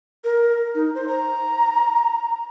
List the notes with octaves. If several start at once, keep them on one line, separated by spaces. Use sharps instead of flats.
A#4
D#4
C5
A#5